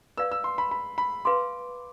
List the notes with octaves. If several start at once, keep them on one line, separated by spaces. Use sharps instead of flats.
B4 D5 F5 E6
E6
C6
B5
B5
B5
B4 F5 C6 D6